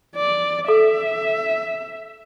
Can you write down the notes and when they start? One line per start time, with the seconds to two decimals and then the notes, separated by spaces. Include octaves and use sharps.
0.16 D5
0.68 A4 E5